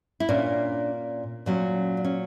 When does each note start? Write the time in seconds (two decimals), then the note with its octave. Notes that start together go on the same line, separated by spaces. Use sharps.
0.20 E4
0.29 A#2 A#3 C#4 D4
1.46 A#2 F#3 C#4
1.97 D4
2.04 C#4